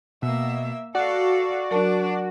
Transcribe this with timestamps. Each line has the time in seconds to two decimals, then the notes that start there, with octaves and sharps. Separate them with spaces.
0.22 B2 A#3 E5
0.95 F#4 A4 D5 F5
1.71 F#3 D4 A#4 A5